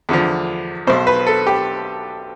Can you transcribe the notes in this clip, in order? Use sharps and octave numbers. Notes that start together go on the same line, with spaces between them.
E2 D3 F3
B1 B2 C5
B4
A4
G4